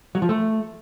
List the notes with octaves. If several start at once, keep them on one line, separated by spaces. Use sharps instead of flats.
F#3
F3
A3